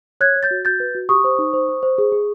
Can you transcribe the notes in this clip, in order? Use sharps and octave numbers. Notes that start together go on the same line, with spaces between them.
C#5 F#6 G#6
C#5
G6 A6
F#4
F#4 G6 A6
B4
F#4
G4 C#6 D#6
C5
D#4
C5
C5
C5
G#4
G#4